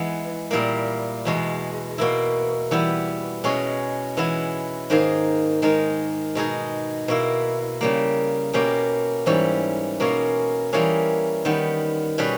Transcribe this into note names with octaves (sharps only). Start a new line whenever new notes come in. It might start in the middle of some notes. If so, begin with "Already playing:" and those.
Already playing: E3 G#3 B3
A#2 G3 A#3 E4 A#4
E2 B2 G#3
B2 A#3 E4
E3 G3 B3 E4
B2 G#3 C#4 G#4
E3 G#3 B3 E4
G#2 D#3 A#3 D#4 G#4
D#3 G#3 D#4 A#4
B2 G#3 D#4 G#4
B2 A#3 E4
C#3 G3 A#3
B2 A#3 C#4 G4
G#2 E3 G3 C#4
B2 A#3 C#4 G#4
E3 G3 A#3 C#4 G#4
D#3 G3 B3
B2 G3 C#4 G#4 B4